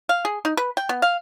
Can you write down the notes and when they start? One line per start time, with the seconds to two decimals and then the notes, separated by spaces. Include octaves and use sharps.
0.09 F5
0.25 G#4
0.45 D#4
0.57 B4
0.77 G5
0.89 B3
1.02 F5